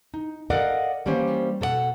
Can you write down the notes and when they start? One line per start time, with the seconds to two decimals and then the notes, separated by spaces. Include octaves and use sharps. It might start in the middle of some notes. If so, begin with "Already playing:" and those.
0.14 D#4
0.50 A4 A#4 D5 D#5 F5 F#5
1.06 E3 G3 A#3 C#4 C5
1.61 B2 A4 C#5 F#5